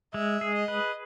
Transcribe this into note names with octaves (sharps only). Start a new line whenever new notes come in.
G#3 E5
G#4
D#5
B4